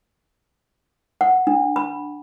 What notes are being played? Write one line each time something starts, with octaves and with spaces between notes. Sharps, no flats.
F#5
D4
B5